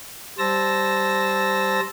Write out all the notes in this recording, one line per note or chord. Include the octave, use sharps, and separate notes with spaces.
G3 C5 A5 E6 A#6